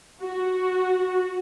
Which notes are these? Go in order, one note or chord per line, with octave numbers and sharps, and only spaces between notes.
F#4